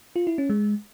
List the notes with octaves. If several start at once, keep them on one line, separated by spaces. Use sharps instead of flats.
F4
E4
C#4
G#3